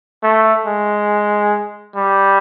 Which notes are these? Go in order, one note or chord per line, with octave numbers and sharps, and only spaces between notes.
A3
G#3
G3